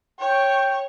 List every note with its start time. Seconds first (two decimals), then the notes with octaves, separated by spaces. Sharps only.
0.20 C#5 G5 C#6